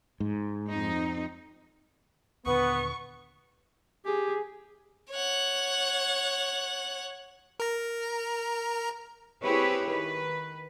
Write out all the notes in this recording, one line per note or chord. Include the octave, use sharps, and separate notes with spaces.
G#2
F2 C4 D#4
D#2 A#2 D3 B3 B4 C#6
G4 G#4
C#5 F#5
A#4 A#5
C4 E4 G4 G#4 B4 C#5
D#3 B4